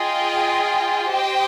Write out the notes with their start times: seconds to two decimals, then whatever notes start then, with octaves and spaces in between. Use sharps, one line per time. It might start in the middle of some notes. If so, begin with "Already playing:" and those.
Already playing: F4 G#4 D#5 G5
1.09 G4 C5 D#5 G5